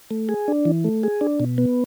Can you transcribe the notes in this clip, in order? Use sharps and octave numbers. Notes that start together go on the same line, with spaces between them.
A3
G#4
D4
E3
A3
G#4
D4
B2
B3